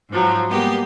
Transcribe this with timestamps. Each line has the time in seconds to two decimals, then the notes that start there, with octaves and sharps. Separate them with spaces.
0.10 G#2 F3 F#3
0.49 G3 G#3 A#3 B3 G4